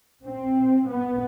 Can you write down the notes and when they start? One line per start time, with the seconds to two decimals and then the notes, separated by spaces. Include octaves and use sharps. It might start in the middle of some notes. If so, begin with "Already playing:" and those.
0.24 A#2 C4
0.88 B3